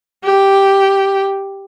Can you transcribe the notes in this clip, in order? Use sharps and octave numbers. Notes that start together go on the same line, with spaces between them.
G4